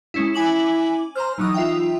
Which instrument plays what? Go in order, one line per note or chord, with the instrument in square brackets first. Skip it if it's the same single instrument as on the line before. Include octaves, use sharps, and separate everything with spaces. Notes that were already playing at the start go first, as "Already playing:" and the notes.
[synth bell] G#3 C#4 E4
[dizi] E4 [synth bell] G#5 D6 F#7
[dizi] C5 [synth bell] A#5 F6
[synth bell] E3 F#3 D#6 [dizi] D#4
[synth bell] F4 E5 G5